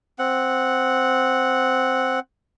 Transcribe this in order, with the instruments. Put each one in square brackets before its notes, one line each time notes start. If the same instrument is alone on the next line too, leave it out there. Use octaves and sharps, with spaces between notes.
[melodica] C4 F#5